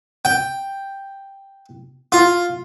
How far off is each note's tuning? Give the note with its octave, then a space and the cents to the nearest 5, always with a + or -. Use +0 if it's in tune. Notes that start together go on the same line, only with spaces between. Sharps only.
G5 +5
F4 +5